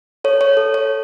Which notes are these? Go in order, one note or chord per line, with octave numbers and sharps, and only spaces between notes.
A4 C#5
C#5
A4
C#5